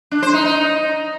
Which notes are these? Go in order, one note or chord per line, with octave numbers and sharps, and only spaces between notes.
D4
C5
D#4
D#4